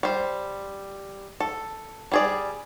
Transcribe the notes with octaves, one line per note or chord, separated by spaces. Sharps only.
G3 C5
A4
G3 G#4 D5